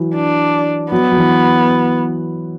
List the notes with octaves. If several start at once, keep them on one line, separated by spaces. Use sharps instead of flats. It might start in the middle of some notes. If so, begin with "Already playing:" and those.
Already playing: E3 F#3
D4
F#3 B3
F#3
E3